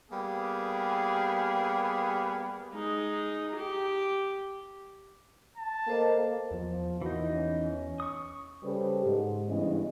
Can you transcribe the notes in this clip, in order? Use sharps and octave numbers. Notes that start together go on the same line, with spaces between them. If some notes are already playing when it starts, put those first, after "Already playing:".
G3 A#3 B3 G4 G#4
G#3 D#4
G4
A5
A#3 A4 C5 D#5
E2 F3
E3 A#3 B3 D#4 F#4
C#4
C#6 D#6
C#3 G3 G4 A4 B4 C5
G#2
G2 C#3 E3 B3 C#4 D#5